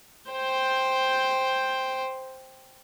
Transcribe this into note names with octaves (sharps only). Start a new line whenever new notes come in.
C5 G5